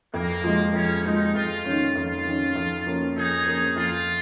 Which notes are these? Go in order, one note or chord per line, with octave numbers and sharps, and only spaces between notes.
F2 A#3
F3 G#3
F2 C#4
F3 G#3 D#4
F2 F4
D#3 C#4
F2 F4
D#3 C#4
F2
F3 A#3 C#4
F2 D#4 G#4
F3 A#3 C#4
F2 F4